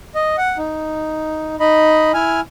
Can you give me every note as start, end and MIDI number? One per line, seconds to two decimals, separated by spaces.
0.15 0.36 75
0.38 0.57 78
0.58 1.56 63
1.60 2.12 63
1.60 2.12 75
1.60 2.12 83
2.14 2.41 64
2.14 2.41 80
2.14 2.41 89